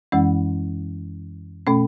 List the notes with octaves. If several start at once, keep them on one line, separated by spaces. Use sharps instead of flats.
F#2 E3 G#3 C#4
B2 A3 C#4